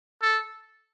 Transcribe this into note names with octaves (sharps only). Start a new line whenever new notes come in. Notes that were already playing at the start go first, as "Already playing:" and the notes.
A4